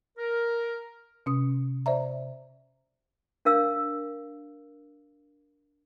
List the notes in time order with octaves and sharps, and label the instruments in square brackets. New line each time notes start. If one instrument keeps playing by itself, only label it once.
[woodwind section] A#4
[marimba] C3 C#4 D#6
C5 D5 E5 A#5
[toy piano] D4 A#4 F5 E6